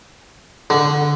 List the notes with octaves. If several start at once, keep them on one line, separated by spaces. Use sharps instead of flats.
D3